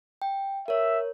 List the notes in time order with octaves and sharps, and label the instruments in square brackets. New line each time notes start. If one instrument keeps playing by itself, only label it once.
[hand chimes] G5
[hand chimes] A#4 C#5 [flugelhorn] E5